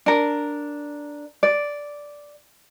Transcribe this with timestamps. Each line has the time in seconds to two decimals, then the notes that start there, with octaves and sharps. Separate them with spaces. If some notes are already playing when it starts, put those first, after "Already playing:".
0.06 D4 A#4
1.43 D5